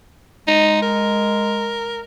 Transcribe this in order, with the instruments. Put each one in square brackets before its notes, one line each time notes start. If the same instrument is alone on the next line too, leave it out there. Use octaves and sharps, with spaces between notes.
[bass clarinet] G#3 [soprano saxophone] D#4
[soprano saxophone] A#4